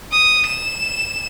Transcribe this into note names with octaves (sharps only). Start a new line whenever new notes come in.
D#6
E7